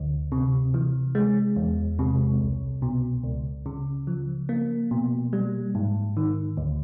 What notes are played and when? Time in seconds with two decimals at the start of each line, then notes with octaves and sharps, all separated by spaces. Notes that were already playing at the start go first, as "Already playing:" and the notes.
Already playing: D2
0.32 C3
0.74 E3
1.15 G#3
1.56 E2
1.99 C3
2.41 C2
2.82 B2
3.23 C#2
3.66 C#3
4.07 F3
4.49 A#3
4.91 B2
5.33 G3
5.75 G#2
6.17 D#3
6.57 D2